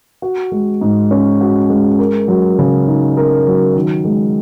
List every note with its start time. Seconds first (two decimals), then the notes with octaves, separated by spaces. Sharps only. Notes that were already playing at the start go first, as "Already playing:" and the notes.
0.22 F#4
0.52 G#3
0.81 G#2
1.11 C#4
1.41 F#4
1.70 G#3
1.99 A#4
2.28 F#3
2.59 C#3
2.88 D#4
3.17 A#4
3.47 F#3
3.76 D#3
4.05 G#3